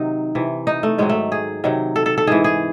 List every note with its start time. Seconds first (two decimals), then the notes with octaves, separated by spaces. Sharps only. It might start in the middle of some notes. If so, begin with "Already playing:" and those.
Already playing: C3 D#3 F#3 D#4
0.35 C3 E3
0.67 D#4
0.83 A3
0.98 G#2 D#3 F#3 G#3
1.09 A3
1.32 G#4
1.64 C3 D#3 F#3
1.96 A4
2.06 A4
2.18 A4
2.27 G#2 E3 G#4
2.44 G#4